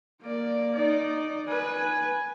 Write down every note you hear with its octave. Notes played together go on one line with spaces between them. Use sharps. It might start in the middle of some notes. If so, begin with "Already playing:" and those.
A#3 D5
D#4 D5
B4 G#5